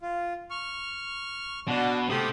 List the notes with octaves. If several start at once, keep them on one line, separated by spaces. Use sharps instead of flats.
F4
C#6 F6
B2 D4 F#4
C3 A3 G4 D#6